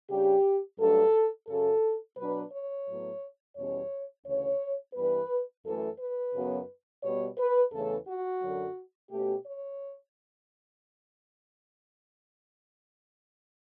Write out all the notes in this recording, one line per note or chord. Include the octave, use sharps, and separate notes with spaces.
C#3 G3 D4 G4
G2 F#3 A3 D4 A4
F#2 C#3 F#3 A4
B2 F#3 B3 D4 B4
C#5
A2 F#3 B3
E2 B2 G3 C#4 C#5
D2 C#3 E3 C#5
G2 E3 G3 B3 B4
F#2 E3 A3 A4
B4
F#2 C#3 F#3 B3
B2 G3 B3 C#5
B4
E2 C#3 E3 A3 C#4 A4
F#4
F#2 D3 F#3
B2 A3 C#4 G4
C#5